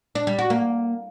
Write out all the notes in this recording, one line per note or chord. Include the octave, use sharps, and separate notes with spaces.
D4
G3
F#4
A#3